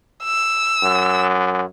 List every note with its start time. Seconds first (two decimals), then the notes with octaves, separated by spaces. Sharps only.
0.24 E6
0.82 F#2